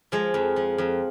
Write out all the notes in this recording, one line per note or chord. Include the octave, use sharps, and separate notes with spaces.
F3 G#3
F2
F3
F2